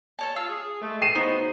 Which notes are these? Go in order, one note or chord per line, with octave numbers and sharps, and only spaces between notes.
A4 C#5 A5
F4 F5 E6
G#4
G#3 A3
C7 D#7 E7
C#3 B3 D#4 F#4 C5